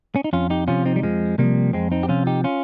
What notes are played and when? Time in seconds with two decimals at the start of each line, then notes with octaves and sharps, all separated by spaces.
0.16 C#4
0.24 D#4
0.33 F2 C#4 F4
0.50 D#4 G4
0.68 C3 F3 C#4 F4
0.85 C4 D#4
0.96 G3
1.03 F2 F3 G#3
1.38 C3 F3 G3 A#3
1.73 F2 G#3 C4
1.92 C4 D#4
2.03 G4
2.09 C3 F3 C#4 F4
2.27 D#4 G4
2.44 C#4 F4